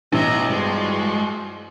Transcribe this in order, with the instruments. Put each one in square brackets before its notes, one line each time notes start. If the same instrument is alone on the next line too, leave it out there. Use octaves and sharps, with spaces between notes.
[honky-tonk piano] A1 [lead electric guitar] B2 [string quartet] D#5 E5 A#5
[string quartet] G2 F3 F#4 [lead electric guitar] G#3